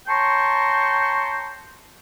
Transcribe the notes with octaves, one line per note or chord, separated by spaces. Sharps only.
C#5 G5 A5 A#5 C6 C#6